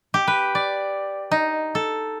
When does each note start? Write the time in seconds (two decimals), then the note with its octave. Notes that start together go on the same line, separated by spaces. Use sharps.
0.14 G4
0.28 B4
0.55 D5
1.31 D#4
1.75 A4